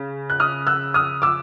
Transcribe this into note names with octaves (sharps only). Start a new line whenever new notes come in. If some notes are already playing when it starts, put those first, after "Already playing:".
Already playing: C#3
F#6
D#6 F6
E6 F#6
D#6 F6
D6 E6